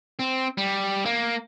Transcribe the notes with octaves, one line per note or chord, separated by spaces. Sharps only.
C4
G3
A#3